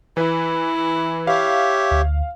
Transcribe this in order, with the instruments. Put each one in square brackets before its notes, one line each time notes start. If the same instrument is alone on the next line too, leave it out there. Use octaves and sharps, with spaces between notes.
[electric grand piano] E3 B4 [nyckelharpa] E4
[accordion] G4 C#5 E5 [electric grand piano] F5
[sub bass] D2